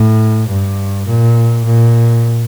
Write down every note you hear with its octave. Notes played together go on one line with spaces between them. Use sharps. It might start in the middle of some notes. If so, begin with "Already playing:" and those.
Already playing: A2
G2
A#2
A#2